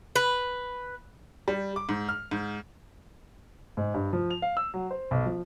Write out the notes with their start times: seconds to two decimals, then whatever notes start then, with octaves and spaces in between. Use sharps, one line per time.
0.16 B4
1.48 G3
1.76 D6
1.89 G#2
2.09 F6
2.31 G#2
3.77 G#2
3.94 G2
4.13 F3
4.30 F7
4.42 F5
4.57 E6
4.74 F#3
4.91 C5
5.11 B1
5.26 F3